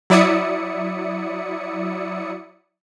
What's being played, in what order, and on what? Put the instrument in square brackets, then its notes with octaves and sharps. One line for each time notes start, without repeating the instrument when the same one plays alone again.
[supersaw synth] F#3 E4 D5 E5 D#6 C#7